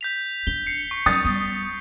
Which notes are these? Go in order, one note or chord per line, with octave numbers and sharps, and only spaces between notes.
G6 B6 F7
D4 G7
C7 C#7
C#6
F#3 D#6 A6
G3 B3